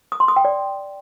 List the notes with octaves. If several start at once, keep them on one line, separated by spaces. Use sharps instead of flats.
D#6
C6
D#6
G5
D5